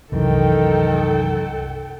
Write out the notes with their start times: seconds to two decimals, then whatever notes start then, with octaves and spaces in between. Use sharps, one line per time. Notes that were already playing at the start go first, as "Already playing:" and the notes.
0.12 C2 F#2 D#3 E3 A4 G5